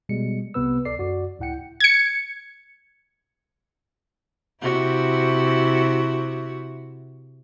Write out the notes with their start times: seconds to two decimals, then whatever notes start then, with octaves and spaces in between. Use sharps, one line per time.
0.09 B2 G3 G#3 C#7
0.54 C2 C3 B3 B4 E6
0.85 C#2 A4 D5 C7
0.98 F#2 F#4 D5
1.39 C#2 A2 E4 F#5 G5 C#7
1.80 G#6 C#7
4.62 C3 E4 F#4